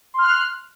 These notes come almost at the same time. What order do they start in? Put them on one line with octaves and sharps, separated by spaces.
C6 F6 F#6